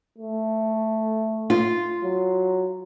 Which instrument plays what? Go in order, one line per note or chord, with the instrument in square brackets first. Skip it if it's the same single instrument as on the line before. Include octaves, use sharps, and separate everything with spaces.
[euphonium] A3
[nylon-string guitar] F4
[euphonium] F#3